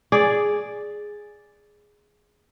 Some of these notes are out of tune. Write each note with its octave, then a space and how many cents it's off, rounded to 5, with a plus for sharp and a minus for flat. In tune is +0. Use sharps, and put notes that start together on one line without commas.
G#4 +0 D5 +0